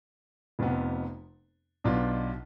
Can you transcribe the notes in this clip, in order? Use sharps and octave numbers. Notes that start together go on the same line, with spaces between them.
F1 F2 C3 F3 B3
B1 B2 B3 D4 F4